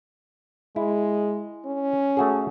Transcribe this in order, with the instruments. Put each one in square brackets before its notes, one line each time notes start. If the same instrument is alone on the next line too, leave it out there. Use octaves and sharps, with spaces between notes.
[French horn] G#3 [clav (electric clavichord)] E4
[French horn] C#4
[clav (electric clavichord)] A3 F#4 G#4